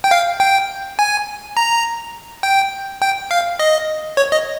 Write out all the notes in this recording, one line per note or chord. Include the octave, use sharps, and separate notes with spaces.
G5
F5
G5
G#5
A#5
G5
G5
F5
D#5
C#5
D#5